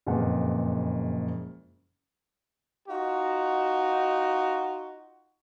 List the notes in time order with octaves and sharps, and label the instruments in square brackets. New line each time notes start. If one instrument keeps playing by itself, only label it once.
[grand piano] F#1 F2 A#2 G#3 B4 F#5
[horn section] D#4 F4 F#4